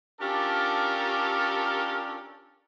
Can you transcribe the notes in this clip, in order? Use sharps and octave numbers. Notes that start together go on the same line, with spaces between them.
C#4 D4 F4 G4 A4 A#4